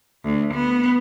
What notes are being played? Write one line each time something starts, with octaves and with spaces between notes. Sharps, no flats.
D2
B3